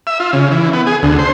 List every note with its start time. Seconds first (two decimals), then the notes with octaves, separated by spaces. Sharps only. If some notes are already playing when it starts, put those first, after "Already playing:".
0.07 E5
0.20 F4
0.33 C#3
0.51 E3
0.73 B3
0.87 G#4
1.02 D2
1.19 C5